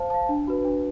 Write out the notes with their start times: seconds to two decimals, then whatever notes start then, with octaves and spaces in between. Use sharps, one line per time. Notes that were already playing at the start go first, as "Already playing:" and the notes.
Already playing: C5 F5 A5
0.10 F5 A5
0.29 D4
0.48 F#4 B4
0.65 D4